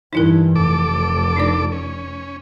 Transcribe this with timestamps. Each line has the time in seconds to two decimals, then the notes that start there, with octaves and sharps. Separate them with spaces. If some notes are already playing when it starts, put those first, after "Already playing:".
0.13 G2 E3 D#4 E4 A#4
0.56 F1 A4 D6
1.36 D4 D#4 D5
1.72 C#4